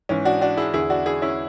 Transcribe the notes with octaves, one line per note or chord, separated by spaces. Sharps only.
G#2 E3 C#4
D4 F#4
D4 F#4
E4 G#4
E2 D3 E4 G#4
D4 F#4
E4 G#4
C#4 E4